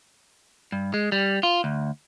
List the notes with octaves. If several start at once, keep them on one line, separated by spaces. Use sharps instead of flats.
G2
G#3
G3
F4
D2